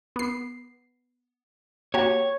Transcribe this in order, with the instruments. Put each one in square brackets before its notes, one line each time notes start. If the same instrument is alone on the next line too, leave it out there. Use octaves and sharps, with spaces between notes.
[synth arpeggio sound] B3 C7
[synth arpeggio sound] A#3 F#4 G4 [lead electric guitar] C#5